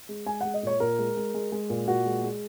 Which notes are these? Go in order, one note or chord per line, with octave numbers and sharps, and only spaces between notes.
G#3
G#3 G#5
G#3 F#5
D#5
A#2 C#5
A#2 A#4
G#3
G#3
G#3
G#3
A#2
A#2 F#4
G#3
G#3